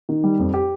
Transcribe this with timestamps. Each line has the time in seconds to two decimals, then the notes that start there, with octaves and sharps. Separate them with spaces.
0.09 D#3
0.24 G3
0.39 F2
0.54 G4